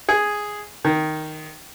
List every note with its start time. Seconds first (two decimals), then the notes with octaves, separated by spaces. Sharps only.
0.09 G#4
0.85 D#3